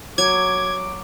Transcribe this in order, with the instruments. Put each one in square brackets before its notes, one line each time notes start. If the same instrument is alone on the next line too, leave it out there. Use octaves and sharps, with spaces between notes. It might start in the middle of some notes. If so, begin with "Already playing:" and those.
[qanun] F#3 [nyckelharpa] D6 [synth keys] G#6